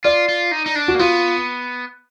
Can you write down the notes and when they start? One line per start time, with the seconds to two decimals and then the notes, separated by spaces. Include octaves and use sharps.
0.04 F4 D5
0.29 F4
0.52 D#4
0.66 D#4
0.75 D4
0.88 F#4
0.95 A#3
0.99 B3 F4